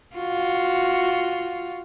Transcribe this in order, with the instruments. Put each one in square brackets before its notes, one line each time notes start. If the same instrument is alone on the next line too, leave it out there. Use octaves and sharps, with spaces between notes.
[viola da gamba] F4 F#4